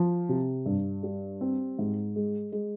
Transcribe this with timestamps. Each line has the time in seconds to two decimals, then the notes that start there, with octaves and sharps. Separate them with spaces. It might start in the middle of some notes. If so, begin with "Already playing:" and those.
Already playing: F3
0.29 C3
0.66 G2
1.03 G3
1.41 C4
1.79 G#2
2.16 G#3
2.52 G#3